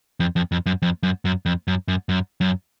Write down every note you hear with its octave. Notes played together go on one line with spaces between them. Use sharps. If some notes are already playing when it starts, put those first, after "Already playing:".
F2
F2
F2
F#2
F2
F#2
F#2
F2
F#2
F#2
F#2
F#2